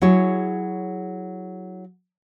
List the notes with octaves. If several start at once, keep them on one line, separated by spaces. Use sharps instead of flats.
F#3 E4 G#4 C#5